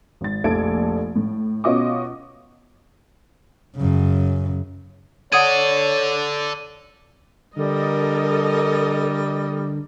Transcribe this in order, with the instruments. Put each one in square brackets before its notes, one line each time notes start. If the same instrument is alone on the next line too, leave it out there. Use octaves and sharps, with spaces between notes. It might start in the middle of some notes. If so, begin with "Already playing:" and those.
[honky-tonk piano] G#1 A6
F1 A#1 A4 D5 G#6 D7
A2
B2 C#4 F4 D#5 C#6 D6
[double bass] F#2 C#3
[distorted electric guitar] A4 D5 [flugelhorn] C#5 [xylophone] F#5 D#6 G#6 [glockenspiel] D#7
[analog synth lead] D3 [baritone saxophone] G3 [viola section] A4 A#4 D#5